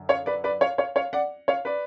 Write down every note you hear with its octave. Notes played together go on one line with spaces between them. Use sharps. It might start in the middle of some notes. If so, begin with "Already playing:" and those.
Already playing: F#2 D3
C#5 F5
B4 D5
B4 D5
C#5 F5
C#5 F5
C#5 F5
D5 F#5
C#5 F5
B4 D5